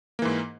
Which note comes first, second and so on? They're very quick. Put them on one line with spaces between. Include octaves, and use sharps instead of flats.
A#3 E3 G#2